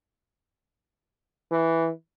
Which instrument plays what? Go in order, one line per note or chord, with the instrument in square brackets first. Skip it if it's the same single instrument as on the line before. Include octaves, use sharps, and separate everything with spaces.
[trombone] E3